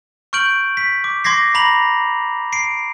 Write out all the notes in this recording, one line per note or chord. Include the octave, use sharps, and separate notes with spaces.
C#6 F6 G6 D7 F#7
B6
D6
C6 D6 G#6 A#6 C7
A#5 B5 A#6 F7 F#7
C7 D7